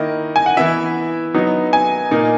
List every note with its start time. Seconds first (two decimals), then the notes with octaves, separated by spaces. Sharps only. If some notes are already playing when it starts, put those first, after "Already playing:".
Already playing: D#3 A#3 E4 D#5
0.36 G#5
0.46 F#5
0.57 E3 B3 E4 E5
1.34 F#3 B3 D#4
1.73 G#5
2.11 A#2 A#3 D#4